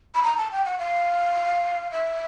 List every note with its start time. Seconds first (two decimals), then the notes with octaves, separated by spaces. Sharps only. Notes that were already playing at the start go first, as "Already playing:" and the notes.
0.15 B5
0.23 A#5
0.37 A5
0.52 G5
0.65 F#5
0.79 F5
1.92 E5